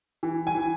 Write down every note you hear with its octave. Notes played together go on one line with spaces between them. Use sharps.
E3
G#5
E3